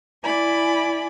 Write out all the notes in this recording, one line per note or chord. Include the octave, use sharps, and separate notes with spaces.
E4 D5 G#5 B5